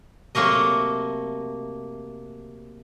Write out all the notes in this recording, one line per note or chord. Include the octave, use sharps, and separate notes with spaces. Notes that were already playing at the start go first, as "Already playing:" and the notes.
C3 F#3 A3 A#3 D#5